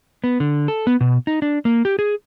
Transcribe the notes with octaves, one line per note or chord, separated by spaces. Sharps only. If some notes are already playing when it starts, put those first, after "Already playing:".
B3
D3
A4
B3
B2
D#4
D4
A#3
G4
G#4